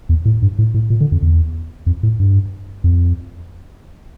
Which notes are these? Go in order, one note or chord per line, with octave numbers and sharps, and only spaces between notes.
E2
A2
G2
A2
A2
A#2
D3
F2
E2
F2
A2
G2
F2